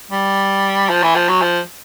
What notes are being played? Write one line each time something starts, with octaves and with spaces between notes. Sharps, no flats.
G3
F3
E3
F3
F#3
F3